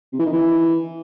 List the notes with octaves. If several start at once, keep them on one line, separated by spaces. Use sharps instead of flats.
C3
E3
D#3
E3